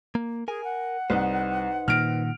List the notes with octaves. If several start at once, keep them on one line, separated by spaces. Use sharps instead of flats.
A#3
G#4 A#4 G#5
F#5
C2 D#4 B4 C5
A#2 D#3 F6 D7